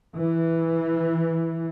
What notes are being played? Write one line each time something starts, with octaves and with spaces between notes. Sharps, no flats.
E3